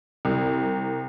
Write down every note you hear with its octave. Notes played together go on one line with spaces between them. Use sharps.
C2